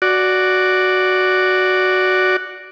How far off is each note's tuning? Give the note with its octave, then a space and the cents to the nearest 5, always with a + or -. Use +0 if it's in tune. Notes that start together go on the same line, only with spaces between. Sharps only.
F#4 +0 D5 +0